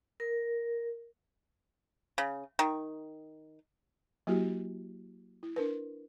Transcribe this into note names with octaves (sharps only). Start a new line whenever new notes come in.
A#4
C#3
D#3
F#3 A#3 E4 F#4 G4
E4
D4 A#4 B4